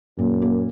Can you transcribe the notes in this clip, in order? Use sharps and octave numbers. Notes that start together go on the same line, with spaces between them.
F#2 A#2
A#3